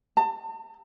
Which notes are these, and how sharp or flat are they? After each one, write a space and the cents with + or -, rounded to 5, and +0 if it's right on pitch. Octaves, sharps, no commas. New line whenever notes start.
A5 +35